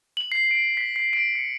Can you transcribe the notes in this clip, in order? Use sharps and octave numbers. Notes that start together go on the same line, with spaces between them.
F#7
C7
D7
B6
C7
D7
C#7